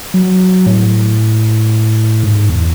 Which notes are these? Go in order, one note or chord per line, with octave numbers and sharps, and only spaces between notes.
F#3
A2
G#2
E2